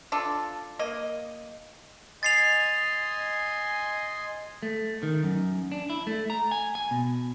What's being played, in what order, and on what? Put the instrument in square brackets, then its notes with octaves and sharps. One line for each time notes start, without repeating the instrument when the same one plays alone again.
[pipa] D4 F4 A4
A#3 D#5
[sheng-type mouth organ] D#5 G#5 C6 [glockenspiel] A6 C7 F7
[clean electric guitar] A3
D#3
F#2
D4
E4
A3
A#5
G#5
G#5
B2